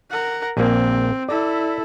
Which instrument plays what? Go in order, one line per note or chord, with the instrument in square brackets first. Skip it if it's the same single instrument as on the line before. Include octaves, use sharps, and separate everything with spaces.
[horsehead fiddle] A#4 F#5
[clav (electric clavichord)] A#1 A#3 [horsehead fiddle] C4
[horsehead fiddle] E4 A4 [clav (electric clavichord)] D5